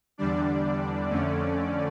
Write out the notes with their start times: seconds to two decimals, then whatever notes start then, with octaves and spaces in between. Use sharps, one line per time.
0.18 E2 D3 G3 D4 D5
1.09 F2 D3 A3 C#4